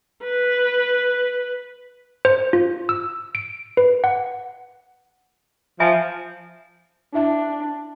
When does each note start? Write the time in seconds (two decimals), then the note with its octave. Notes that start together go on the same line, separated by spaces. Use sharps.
0.23 B4
2.25 C5
2.53 F4
2.89 E6
3.35 D7
3.77 B4
4.04 F#5
5.80 F3 E5 G#5 A5
7.14 D4 E4 E5 A5